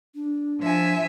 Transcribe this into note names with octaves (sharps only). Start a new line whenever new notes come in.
D4
F3 E5 G#5